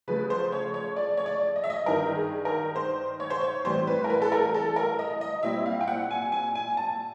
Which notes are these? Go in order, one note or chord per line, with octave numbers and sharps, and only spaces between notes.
C#3 F3 A3 B4
C5
C#5
C#5
D5
C#5
D5
D#5
E5
D#5
G2 D#3 G3 A#4
G#4
A#4
C5
C#5
C5
C#5
A2 E3 G3 C4 C5
B4
A#4
B4
A4
A#4
A4
A#4
D#5
D#5
A#2 G3 C4 E4 E5
F5
G5
F#5
G#5
G#5
G#5
A5